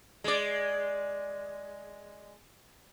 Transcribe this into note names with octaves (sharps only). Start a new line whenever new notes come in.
G#3 D5